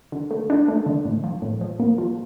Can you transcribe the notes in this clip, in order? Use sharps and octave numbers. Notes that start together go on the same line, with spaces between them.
D3
A3
D4
A3
D3
A2
F3
A2
F3
A#3
F3